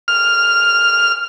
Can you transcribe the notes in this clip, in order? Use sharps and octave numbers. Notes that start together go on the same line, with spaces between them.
F6